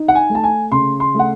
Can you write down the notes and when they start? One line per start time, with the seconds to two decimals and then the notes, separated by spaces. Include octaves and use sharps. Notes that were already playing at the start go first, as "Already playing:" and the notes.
Already playing: D#4
0.08 F#5
0.15 G#5
0.30 A3
0.35 A5
0.44 G#5
0.72 C#3 C6
1.00 C6
1.15 A3 F#5